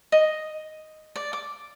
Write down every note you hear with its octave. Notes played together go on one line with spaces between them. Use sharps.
D#5
D5
D6